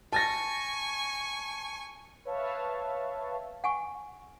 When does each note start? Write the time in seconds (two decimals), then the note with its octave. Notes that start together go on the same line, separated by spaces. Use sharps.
0.13 G#5 A5 C#6 A6 A#6
2.25 B4 C#5 E5 F5 A5
3.64 F#5 G#5 C#6